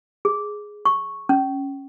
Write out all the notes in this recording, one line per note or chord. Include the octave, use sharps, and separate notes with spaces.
G#4
C#6
C#4